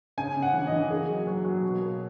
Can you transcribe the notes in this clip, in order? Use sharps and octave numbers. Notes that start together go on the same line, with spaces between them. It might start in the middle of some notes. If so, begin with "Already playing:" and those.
C#3 G#5
C#3
F#5
E3
E3 D#5
A#3 G#4
F#3
F#3
F#3
B2
A#3